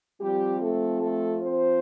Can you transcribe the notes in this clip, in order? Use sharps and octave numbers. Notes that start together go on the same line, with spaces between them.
F3 G3 C4 G4
A3 A4
A3 A4
C4 C5